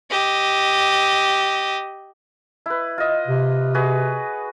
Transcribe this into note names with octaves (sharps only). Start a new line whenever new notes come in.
G4 D#5
E4 B4
F4 D#5
C3
F#4 G#4 B4